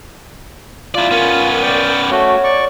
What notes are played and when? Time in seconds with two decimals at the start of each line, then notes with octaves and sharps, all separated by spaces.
0.95 E4 F4 D5
1.11 B3 C#4 A#4
1.62 D5 G5
2.11 A3 F#4 C#5
2.44 D5 C#6